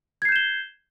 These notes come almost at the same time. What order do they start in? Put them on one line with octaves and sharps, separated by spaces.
G#6 C7 G6 E7 G7